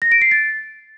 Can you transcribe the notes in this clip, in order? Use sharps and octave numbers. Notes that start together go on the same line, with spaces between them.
A#6
D7
C7
A6